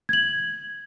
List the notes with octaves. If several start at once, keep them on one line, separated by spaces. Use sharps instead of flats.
G#6 F#7